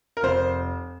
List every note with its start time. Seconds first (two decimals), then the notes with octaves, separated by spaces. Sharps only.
0.17 A#4
0.23 F1 C5